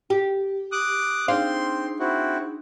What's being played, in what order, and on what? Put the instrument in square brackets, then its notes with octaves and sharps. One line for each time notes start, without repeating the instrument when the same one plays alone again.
[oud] G4
[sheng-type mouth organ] D6 D#6 F#6
[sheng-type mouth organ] C4 C6 [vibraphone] D4 D#4 G#4 [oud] F5
[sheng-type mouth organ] C4 E4 F#4